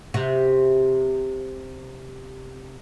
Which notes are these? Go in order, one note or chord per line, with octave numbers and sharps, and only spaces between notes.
C3 F#4